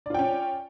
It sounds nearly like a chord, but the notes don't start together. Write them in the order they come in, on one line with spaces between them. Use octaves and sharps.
D5 F4 G5 C#4